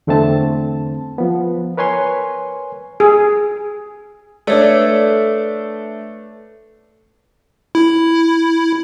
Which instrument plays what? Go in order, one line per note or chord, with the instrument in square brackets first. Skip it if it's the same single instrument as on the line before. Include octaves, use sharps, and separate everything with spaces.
[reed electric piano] E2 D3 A3 C4 A5
F3 B3
A#4 B4 C#5 G#5 C6
[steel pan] G#4
[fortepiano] A3 D4 [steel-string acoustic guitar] A4 B4 E5 [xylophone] C#5 D5
[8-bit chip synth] E4